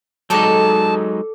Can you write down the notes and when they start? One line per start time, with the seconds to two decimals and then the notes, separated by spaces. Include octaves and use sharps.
0.30 F#3 G#3 D#4 A4 D5 G5 A5